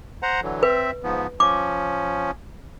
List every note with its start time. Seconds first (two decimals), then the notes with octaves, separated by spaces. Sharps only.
0.23 C5 F#5 A#5
0.43 D3 E3 F#3
0.63 C4 B4 E5
1.04 G#2 F3 B3
1.40 F3 C#4 D6